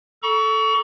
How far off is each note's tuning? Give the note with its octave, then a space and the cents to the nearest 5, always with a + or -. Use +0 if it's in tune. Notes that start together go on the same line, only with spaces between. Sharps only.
A4 -5 A#5 +40 C#6 +30